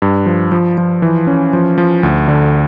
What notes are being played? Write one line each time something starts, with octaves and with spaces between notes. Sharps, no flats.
G2
F3
F3
F3
E3
C#4
F3
F3
D2
D3